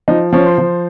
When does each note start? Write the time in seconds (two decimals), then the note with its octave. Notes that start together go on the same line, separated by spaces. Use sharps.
0.08 F3 D#4
0.33 F3 C#4
0.46 C5
0.58 F3